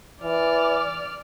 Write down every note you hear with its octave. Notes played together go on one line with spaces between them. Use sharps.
E3 D5 F6